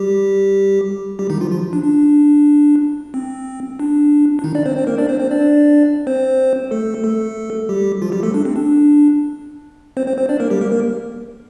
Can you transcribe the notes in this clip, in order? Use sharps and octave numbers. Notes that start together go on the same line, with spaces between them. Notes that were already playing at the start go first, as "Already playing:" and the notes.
Already playing: G3 G4
G3 G4
D#3 D#4
F3 F4
F3 F4
D4
D4
C4
D4
D4
D#3 D#4
D4 D5
C4 C5
C4 C5
A#3 A#4
D4 D5
C4 C5
C4 C5
D4 D5
C4 C5
A3 A4
A3 A4
G3 G4
F3 F4
G3 G4
A3 A4
D4
C4
D4
C4 C5
C4 C5
C4 C5
D4 D5
A#3 A#4
G3 G4
A#3 A#4
A#3 A#4